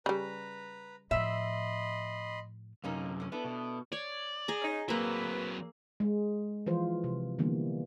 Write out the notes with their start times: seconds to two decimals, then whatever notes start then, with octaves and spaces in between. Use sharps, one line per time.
0.06 C#3 G3 B4 A#5
1.11 A2 F3 D#5 E5 B5 C6
2.84 F#2 C3 A#3 C#4 D#4
3.20 D3 C#4
3.32 B3 D4 E4 A4
3.45 B2
3.92 C#5 D5
4.48 G#4 A#5
4.61 C#4 D#4
4.88 F#3 A#3 C4 B4 E5
6.00 G#3
6.66 E3 F3 F4 C5
7.04 C3
7.39 D3 E3 G3 A#3 B3